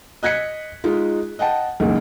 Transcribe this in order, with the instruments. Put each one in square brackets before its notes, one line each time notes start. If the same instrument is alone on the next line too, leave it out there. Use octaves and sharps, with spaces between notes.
[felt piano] D#5 F#6 G#6 B6 C#7
G#3 D#4 F4
D#5 F#5 G5 A5
B1 E2 C#3 G#3 A#3